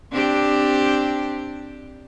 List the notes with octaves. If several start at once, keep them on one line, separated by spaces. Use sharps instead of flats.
C4 D4 G4